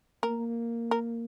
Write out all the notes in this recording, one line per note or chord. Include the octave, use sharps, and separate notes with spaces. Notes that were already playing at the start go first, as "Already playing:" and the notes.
A#3 A#4
A#4